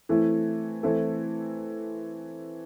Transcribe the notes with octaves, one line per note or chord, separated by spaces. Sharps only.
E3 A3 C4 E4
E3 A3 C4 E4 A4